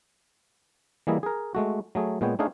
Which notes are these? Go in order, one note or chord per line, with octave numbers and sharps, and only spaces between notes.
E3 G3 A#3 E4 G#4 D#5
G#4 A#4
G#3 A3 F#4
F#3 A3 G#4
A#2 G#3 B3 C#5 G5
A3 D4 D#4 G#4 C#5 F5